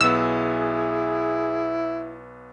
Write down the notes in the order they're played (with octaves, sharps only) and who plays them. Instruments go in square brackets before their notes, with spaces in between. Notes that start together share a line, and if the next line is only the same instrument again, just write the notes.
[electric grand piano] B1 B3 [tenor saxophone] E4 [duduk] G#4 [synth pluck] E6